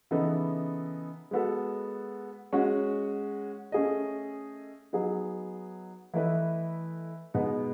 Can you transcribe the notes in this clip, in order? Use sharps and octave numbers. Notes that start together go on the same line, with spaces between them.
C#3 E3 B3 D#4 A4
G#3 B3 F#4 A4
G#3 C#4 F#4 C#5
A3 C#4 G#4 D#5
F#3 B3 D#4 G#4
E3 A3 E4 B4 D#5
B2 G#3 B3 D#4